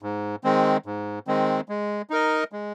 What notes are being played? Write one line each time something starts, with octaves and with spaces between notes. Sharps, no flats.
G#2
D#3 G#3 C4
G#2
D#3 G#3 C4
G#3
D#4 A#4 D#5
G#3